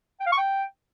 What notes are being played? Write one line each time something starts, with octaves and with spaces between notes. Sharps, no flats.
G5
F5
C#6
G5